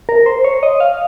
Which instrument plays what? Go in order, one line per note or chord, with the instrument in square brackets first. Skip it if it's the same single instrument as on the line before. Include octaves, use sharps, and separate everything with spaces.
[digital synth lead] A#4
C5
C#5
D#5
F5